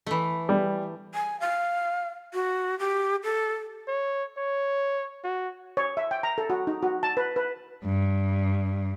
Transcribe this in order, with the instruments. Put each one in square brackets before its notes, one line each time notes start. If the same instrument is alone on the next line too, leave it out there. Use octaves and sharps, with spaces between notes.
[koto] E3 A3
[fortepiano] G3
[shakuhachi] G#5
F5
F#4
G4
A4
[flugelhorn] C#5
C#5
F#4
[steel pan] C#5
E5
G5
A#5
A4
F#4
D#4
F#4
A5
B4
B4
[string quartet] G2